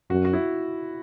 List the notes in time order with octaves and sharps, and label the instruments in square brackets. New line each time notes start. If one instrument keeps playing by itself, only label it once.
[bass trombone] F#2 [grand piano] F#4
[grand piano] F#4
E4